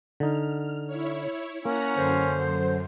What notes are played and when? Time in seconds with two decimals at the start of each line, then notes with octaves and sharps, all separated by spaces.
0.20 D3 D#4 F6
0.87 E4 C#5
1.65 A#3 C#4 F#5 A#5
1.96 F#2 D3 C5